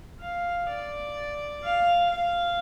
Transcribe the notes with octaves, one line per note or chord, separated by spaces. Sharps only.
F5
D5
F5
F5